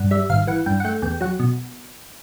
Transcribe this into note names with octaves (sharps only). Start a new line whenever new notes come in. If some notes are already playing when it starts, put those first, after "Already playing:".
Already playing: G2 F#5
G3 E5
G#1 F5
E3 F#5
G2 G5
F#5
A3 G5
E2 G5
F#3 F#5
B2